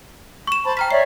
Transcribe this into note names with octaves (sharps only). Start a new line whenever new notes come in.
C#6 E7
C5 A5 B5
G5 A#5 F6 B6
C#5 D5 E5 C7